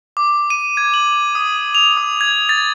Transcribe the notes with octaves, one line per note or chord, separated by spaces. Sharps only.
D6
D#7
G#6
F#7
D#6
F7
D#6
G#6
A6